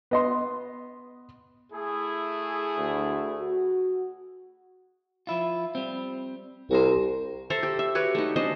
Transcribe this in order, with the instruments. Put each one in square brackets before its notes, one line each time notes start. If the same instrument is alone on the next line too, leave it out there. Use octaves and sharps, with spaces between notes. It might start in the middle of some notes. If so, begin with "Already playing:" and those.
[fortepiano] B3 D#5 C6
[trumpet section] A3 E4 G#4
[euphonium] D2
F#4
[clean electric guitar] F3 E4 F4
G3 C4
[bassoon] C2 [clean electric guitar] F#4 A#4 C5
[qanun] A4 C5 E5 A#5
G4
E5
F#4 G4 B4 C#5
A3 D#4
C#4 D4 C5 D#5